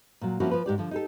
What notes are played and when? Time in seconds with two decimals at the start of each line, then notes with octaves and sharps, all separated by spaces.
0.21 A#2 F#3
0.40 F3 A#3 C4 C#4 E4 F#4
0.51 F3 F4 B4
0.66 G#2 G4 D5
0.78 D3 F3
0.91 D#4 G4 A4